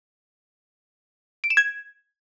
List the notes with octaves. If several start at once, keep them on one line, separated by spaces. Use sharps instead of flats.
D7
E7
G#6